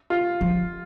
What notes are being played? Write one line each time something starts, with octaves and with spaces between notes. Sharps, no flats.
F4
F3